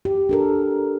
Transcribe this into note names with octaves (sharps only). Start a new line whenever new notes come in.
G4
D4 A4 A#4